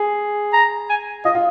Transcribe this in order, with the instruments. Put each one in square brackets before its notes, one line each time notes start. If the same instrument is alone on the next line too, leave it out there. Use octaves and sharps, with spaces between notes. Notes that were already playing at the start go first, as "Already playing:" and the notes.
Already playing: [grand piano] G#4
[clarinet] A#5
G#5
[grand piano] F4 [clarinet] D#5
[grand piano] F4